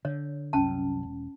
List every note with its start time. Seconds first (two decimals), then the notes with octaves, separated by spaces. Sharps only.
0.05 D3 C#5
0.53 C2 F#2 C#4 A5
1.03 E1